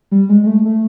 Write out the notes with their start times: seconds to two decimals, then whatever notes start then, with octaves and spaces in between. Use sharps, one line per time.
0.12 G3
0.29 G#3
0.44 G#3
0.47 A3
0.65 A3